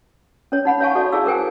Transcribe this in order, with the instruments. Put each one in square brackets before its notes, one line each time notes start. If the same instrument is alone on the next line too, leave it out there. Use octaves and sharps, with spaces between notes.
[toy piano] C#4 C#5
D#4 F#5 B5
C#5 E5 F5 G#5 A5 C#6
F#4 A4 C#5 D5 E5
E4 G#4 D5 F5 E6
A4 A#4 C5 G5 G#5